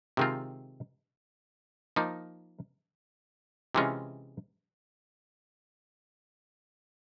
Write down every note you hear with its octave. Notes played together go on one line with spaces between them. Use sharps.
C3 D#3 G#3 C4 F4
F3 A#3 D#4
C3 E3 G#3 C#4 F4